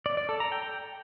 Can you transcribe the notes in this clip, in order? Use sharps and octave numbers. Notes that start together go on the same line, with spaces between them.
D5
D5
A4
A#5
G5